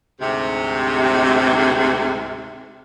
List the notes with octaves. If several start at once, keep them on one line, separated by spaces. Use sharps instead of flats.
D2 G#2 C3